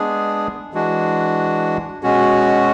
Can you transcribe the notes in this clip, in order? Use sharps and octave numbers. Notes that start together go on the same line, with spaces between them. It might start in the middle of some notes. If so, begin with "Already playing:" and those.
Already playing: G#3 B3 D4 G#4
E3 G#3 D4 F#4
B2 G#3 C#4 F#4